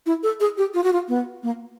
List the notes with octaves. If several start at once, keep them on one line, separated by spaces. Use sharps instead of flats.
E4
A4
G#4
G4
F4
F#4
F4
B3
A#3